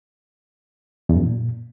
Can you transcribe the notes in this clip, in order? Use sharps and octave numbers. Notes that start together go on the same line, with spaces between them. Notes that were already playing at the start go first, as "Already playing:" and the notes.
E2
F#2
A#2